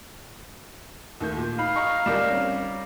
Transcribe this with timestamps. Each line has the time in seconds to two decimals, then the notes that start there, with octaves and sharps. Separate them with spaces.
1.21 D#2 A3 G6
1.37 A#2
1.58 D#4 F5 B5
1.76 D#5 A#5 C#6
2.06 C#2 G3 D#4 A#4 D5 E7
2.29 C4 C#4